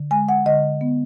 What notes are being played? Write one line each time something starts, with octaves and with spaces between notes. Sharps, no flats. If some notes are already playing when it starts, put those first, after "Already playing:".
Already playing: D3
G#3 G#5
F#5
D3 D#5
B3